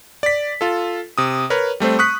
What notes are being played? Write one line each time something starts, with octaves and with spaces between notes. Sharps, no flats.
D5 B6
F4 A4
C3 D#6
A#4 B4 C#5
G3 A3 C4 C5
C#6 D#6 F#6 B6